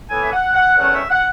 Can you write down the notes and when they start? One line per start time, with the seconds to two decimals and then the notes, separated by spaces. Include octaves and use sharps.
0.10 A2 E3 B3 G#5
0.21 E5
0.32 F#5
0.54 F#5
0.76 E2 D#3 A3 C#4 F#5
0.93 E5
1.10 F#5